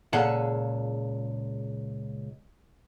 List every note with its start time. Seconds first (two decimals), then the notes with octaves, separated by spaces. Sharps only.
0.13 C#2 A#2 G#4 A4 F#5